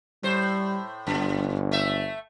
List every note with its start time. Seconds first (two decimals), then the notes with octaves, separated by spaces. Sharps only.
0.23 A2 G3 C5
1.07 G1 F#2
1.72 A3 E5